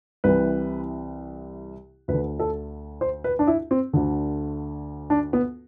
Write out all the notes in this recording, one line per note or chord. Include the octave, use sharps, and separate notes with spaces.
C2 C3 E3 B4
D2 B4
D3
A4
C5
B4
D4
E4
C4
D2 D3
D4
B3